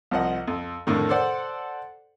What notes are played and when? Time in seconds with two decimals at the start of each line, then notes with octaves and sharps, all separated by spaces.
0.11 C2 F3 D#5 F#5
0.48 F2
0.87 F2 A2 D3 D#3
1.09 A4 C5 D5 F#5